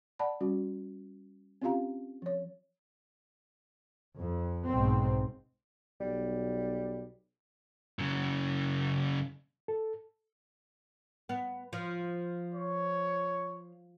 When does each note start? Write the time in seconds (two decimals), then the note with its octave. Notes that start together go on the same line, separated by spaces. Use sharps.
0.19 D5 F#5 A5 B5
0.41 G3 C#4 F#4
1.62 C4 C#4 F4 G4 F5 A#5
2.22 F3 C#5
4.18 F2
4.68 B1 G#2 B2 C4
6.01 B1 G3
7.99 F#2 C#3
9.68 A4
11.29 B3
11.73 F3
12.55 C#5